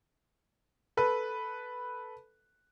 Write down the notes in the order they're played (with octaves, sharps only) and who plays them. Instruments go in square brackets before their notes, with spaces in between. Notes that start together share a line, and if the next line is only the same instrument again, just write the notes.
[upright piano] A4 B4